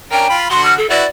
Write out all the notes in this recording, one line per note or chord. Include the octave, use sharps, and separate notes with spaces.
C#4 D4 A#4 G5
F4 B5
D3 F#4 F#5 C6
F6
A4
E4 F#4 B4 D5